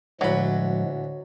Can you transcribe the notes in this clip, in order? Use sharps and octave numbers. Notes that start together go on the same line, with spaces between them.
D2 A2 F3 F#3 G#3 B5